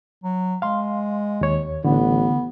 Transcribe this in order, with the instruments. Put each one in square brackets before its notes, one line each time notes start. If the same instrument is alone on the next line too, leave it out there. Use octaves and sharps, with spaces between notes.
[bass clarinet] F#3
[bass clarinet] G#3 [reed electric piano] F5 C6
[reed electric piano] D#2 C#5
[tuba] A1 [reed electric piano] D3 [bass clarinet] B3